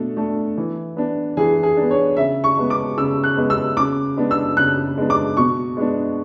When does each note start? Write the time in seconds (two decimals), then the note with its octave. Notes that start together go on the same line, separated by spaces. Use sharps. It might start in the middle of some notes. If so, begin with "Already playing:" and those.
Already playing: B2 A3 D4 A4
0.17 A3 D4
0.57 E3
0.97 B3 D4
1.37 E3 G#4
1.63 G#4
1.77 B3 D4
1.91 C#5
2.17 C#3 E5
2.44 C#6
2.57 G#3 B3
2.70 D6
2.97 C#3 E6
3.24 F#6
3.37 G#3 B3
3.50 E6
3.77 C#3 D6
4.17 G#3 B3 D4
4.31 E6
4.57 C#3 F#6
4.98 G#3 B3 D4
5.10 D6
5.37 B2 C#6
5.77 G#3 B3 D4